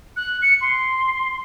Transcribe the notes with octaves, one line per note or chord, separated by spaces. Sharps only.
F#6
C#7
C6